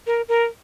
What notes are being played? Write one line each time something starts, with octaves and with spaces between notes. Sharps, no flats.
A#4
A#4